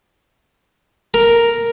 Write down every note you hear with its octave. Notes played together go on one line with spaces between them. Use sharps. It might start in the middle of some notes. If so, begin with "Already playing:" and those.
A#4